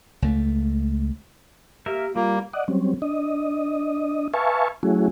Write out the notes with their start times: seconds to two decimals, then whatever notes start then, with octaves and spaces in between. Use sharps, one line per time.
0.22 C#2 A3
1.86 A#3 G4 A#4 E5
2.15 G3 A#3 F4
2.53 D5 D#5 F#5
2.68 F#3 G3 C4 C#4
3.02 D4 D#5
4.34 B4 E5 F5 G#5 A5 C#6
4.83 F#3 A3 C#4 E4 F#4 G#4